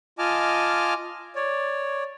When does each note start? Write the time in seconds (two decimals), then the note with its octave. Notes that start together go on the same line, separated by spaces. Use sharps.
0.19 F4 D#5 G#5 A5 D6 F6
1.36 C#5 D5